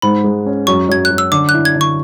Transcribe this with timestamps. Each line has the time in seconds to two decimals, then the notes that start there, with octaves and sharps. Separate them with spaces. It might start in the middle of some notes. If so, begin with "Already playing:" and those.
0.02 G#2 B5
0.24 G#3
0.46 C#4
0.67 F#2 C#6
0.89 F#2 G#6
1.05 F#6
1.11 F#3
1.18 E6
1.32 D3 D6
1.49 F#6
1.54 E4
1.65 G#6
1.75 D3
1.81 C#6